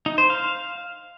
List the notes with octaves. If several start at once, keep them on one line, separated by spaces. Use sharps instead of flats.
D#4
C5
F5